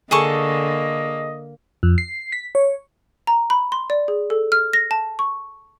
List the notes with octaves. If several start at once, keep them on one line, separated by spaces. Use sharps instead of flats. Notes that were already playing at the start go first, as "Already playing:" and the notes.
D3 A#3 G#4 A4 D#5 C#6
F2
C7
B6
C#5
A#5
B5
C6
D5
G#4
A4
F6
A#6
A5
C#6